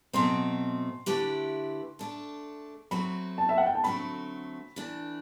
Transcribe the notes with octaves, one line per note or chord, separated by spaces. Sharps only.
B2 F#3 A3 C4 C6
D3 A3 E4 G4 B4
A3 D4 A4
F#3 A3 C4 F#4 B5
A5
E5
F#5
G5
A5
D3 F#3 A3 C4 F#4 B5
E3 A3 D4